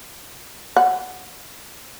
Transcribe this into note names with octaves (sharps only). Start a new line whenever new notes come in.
F#5